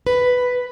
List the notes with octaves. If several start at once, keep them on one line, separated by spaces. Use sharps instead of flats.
B4